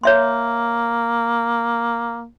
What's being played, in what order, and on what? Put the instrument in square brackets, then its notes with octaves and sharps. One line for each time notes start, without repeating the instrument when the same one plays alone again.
[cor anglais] A#3 [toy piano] C#5 E5 C6